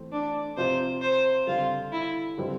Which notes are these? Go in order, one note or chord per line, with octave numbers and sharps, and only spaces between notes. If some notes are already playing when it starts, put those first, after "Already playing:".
Already playing: E3 A3 C4
D4
C3 F3 C4 F4 C5
C5
D3 G3 C4 F4
E4
D3 G3 C4 F4